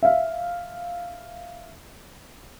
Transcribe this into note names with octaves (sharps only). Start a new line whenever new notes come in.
E5 F5